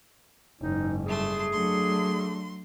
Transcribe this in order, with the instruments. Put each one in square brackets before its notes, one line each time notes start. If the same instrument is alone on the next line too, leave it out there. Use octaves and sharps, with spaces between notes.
[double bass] F#1 G#2 [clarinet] D#4
[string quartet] G3 A3 C6 [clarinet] G#4
[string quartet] F#3 C6 [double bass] A3 D4